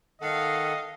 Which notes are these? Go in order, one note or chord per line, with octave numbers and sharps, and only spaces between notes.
D#3 A4 D#5 F5 F#5